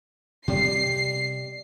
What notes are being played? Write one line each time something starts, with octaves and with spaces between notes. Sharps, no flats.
C3 G3 B3 G4 D5 D#5 C7